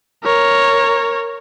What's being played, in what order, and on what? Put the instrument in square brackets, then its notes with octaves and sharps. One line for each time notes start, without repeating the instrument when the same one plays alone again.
[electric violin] A#4 C#5